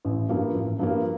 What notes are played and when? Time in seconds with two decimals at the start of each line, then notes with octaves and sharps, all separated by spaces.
0.05 A1
0.29 G2 F3 A#3
0.55 A1
0.79 G2 F3 A#3